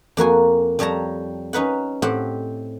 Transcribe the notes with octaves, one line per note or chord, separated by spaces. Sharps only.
F2 A#3 F#4 G#5
F2 G3 C#5 A5 A#5
C#4 D#4 B4 F#5
A2 C4 G4 F#5